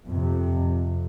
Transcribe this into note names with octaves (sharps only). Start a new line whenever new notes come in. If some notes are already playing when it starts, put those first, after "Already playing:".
F2 C3